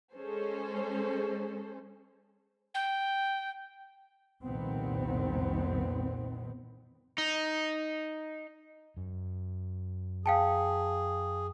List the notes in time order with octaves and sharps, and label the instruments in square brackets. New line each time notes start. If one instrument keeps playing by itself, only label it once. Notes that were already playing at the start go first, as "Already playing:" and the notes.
[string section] G#3 C#4 G#4 A4 C5
[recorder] G5
[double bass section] C2 F2 A#2 D#3 B3 C4
[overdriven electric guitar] D#4
[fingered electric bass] F#2
[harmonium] G#4 [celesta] F5 G5 A5